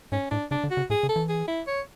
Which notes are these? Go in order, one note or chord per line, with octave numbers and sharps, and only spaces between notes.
G#2 C#4
A2 D4
C#3 D4
D3
F#4
C#3
A2 G#4
C#3
A4
E3
G#4
E4
C#5